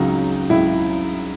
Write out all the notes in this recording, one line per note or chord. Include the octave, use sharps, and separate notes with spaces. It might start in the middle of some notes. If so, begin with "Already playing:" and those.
Already playing: C#2 C#3 F#3 D#4
C#2 C#3 F#3 E4